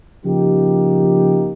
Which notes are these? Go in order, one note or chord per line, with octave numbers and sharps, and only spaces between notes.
C#3 F3 A#3 D#4 G4